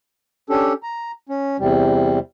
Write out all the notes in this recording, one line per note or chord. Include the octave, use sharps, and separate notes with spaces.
C#4 D4 G4 A4
A#5
C#4
E2 C3 G3